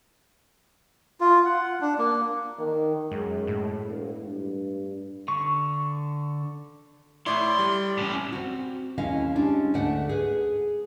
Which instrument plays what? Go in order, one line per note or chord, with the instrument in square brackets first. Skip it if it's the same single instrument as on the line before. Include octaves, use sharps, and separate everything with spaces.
[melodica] F4
F#5
D4
A#3
[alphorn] D#3
[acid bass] F#2 [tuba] G#3
[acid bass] A2
[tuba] E1
G2
[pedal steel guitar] D3 C#6
[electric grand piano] A2 E4 [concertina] D5 [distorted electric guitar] C6
[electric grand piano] G3
[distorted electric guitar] A2 C#4
[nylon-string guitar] C4 F#4
D#2 G#3 C#4 E4 D#5 F5
G3 G#3 C#4 D4
D2 G#2 A3 D5 F#5
G#4 B4